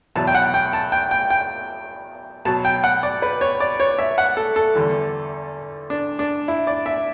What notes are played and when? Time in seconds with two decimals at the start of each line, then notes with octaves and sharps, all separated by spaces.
0.16 E2 B2 F#3 A5
0.27 G5
0.35 F#5
0.54 G5
0.73 A5
0.92 G5
1.11 G5
1.30 G5
2.45 B2 F#3 A5
2.65 G5
2.84 F#5
3.03 D5
3.22 B4
3.41 C#5
3.60 D5
3.80 C#5
3.99 E5
4.18 F#5
4.37 A4
4.56 A4
4.75 E2 D3 G3
5.90 D4
6.19 D4
6.48 E4
6.67 D5
6.86 E5